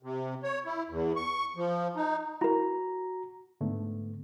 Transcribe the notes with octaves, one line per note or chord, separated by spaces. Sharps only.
C3
C#5
E4
E2
C#6
F3
D#4
E4 F#4 A#4 A#5
G#2 D3 A3 B3